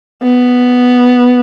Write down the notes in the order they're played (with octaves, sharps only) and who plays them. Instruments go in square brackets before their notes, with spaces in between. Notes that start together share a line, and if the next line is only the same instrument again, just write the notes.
[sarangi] B3